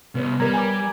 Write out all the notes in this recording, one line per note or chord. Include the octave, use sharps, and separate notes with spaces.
C2 B3 B4 C#5
G3 A#4 A#5 G#6
G#5 A#5 D6